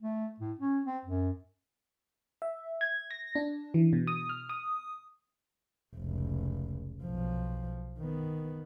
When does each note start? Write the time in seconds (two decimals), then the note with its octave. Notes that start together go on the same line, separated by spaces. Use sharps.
0.02 A3
0.40 A2
0.59 C#4
0.86 C4
1.05 F#2
2.42 E5
2.81 G#6
3.11 A#6
3.35 D4
3.74 E3
3.93 B2
4.07 D#6
4.29 F6
4.49 D#6
5.96 F1 C#2
7.03 B1 F3
7.99 D#3 B3